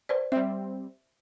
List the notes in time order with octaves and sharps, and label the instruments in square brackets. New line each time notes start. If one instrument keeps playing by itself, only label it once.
[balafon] B4 C5 D5
[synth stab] G3 C4 [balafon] E5